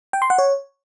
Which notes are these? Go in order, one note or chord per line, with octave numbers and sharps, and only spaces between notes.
G5
C6
F#5
C#5